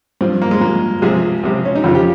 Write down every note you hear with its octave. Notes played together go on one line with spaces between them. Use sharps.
G2 F3 C4
A#3
G#3
G2 F3 A#3
C#2 C3 F3 G#4
C#2 C3 F3
C#4
D#4
F2 C#3 F3 F4
G4